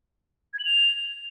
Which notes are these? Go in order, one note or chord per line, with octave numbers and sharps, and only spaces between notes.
G#6
F#7
F7